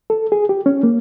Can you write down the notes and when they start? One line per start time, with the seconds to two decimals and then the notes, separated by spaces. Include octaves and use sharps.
0.10 A4
0.32 G#4
0.49 G4
0.66 C#4
0.83 A#3